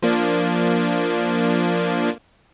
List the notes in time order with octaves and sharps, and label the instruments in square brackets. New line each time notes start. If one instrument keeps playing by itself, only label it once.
[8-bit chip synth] F3 A#3 D4